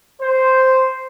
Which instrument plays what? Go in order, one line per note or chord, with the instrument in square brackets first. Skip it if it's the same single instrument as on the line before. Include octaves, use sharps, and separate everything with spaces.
[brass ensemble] C5